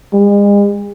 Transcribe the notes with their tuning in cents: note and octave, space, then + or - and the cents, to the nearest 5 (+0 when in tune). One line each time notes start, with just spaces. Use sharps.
G#3 -45